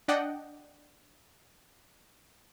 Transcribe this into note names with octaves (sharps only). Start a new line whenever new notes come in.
D4 D5 D#5 F#5 G5